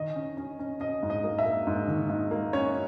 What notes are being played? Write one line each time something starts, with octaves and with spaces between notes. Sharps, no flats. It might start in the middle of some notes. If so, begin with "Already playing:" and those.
Already playing: D#3 D#5
C#4
C#4
C#4
C#4 D#5
G#2
D#5
A#3
E5
A#3
G#2
D#3
G#2
A#3
C#4 C#5